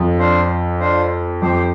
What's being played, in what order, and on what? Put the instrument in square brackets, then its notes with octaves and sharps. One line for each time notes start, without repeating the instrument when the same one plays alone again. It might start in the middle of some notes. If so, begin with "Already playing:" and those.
Already playing: [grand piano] F2
[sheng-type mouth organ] D4 F4 C5
D4 F4 C5
[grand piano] F2 [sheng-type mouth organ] G4 C5 G5